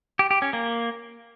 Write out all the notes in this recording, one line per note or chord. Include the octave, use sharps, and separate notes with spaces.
G4
G4
C#4
A#3